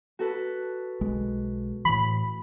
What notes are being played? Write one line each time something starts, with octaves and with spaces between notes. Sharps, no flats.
F#4 A4 B4
B1 G#3
A2 E3 B5